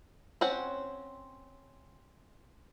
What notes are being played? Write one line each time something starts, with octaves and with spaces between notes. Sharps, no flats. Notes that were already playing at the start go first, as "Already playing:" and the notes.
C4 C#4 C5 F#5